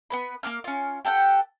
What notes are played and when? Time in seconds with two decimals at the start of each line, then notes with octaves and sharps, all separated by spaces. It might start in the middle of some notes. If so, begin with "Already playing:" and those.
0.10 B3 B4 B5
0.43 A#3 G#4 D6 F6
0.64 C#4 F4
1.05 G4 A4 F#5 G5